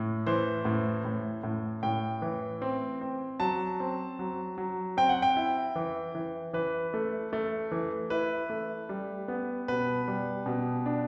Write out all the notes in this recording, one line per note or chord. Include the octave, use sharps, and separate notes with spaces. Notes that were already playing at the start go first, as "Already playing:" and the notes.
Already playing: A2
E3 C5
A2
A2
A2
A2 G5
E3
C4
C4
F#3 A5
C4
F#3
F#3
C4 G5
F#5
G5
E4
E3
E3
E3 B4
A3
A3
E3
E4 B4
A3
G3
B3
B2 B4
G3
B2
D4